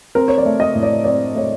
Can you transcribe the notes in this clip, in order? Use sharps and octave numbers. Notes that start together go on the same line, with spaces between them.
C4 A#4
C#5
D5
A3
D#5
A2
D5
C4 D5
A3 C#5